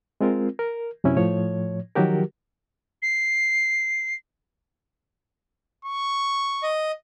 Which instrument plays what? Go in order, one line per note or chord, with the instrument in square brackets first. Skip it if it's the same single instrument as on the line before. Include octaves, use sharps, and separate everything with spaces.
[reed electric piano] G#3 C4 F4 A#4
A#4
F#2 C3 C#4 E4
A2 F3 C#5
D#3 F3 F#3 F#4 G4 A#4
[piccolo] C7
[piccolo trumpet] C#6
[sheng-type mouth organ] D#5